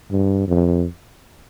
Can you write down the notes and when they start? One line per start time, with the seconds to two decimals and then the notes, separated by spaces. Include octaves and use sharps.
0.11 G2
0.48 F2